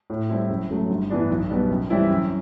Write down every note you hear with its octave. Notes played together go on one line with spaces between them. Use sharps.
A2
G3 C4 E4
F#1
F#2 F#3 A3
G1
G2 E3 B3 D4
B1
B2 G3 B3
F#2
E3 G3 C4 E4
F#2